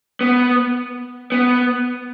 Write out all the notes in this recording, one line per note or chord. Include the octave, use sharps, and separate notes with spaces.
B3
B3